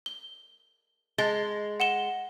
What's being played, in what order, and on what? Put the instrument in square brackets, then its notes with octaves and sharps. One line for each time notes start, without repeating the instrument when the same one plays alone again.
[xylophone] G7
[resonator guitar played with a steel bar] G#3 [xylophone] A6 G7
[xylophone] F#5 E7 G7